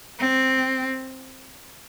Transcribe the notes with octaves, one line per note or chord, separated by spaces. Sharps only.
C4